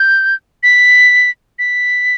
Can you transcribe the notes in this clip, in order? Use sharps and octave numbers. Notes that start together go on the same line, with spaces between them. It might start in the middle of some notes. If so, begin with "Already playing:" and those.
Already playing: G6
B6
B6